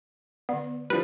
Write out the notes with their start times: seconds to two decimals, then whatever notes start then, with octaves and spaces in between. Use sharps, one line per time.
0.49 D3 B3 D5
0.90 F3 G3 B4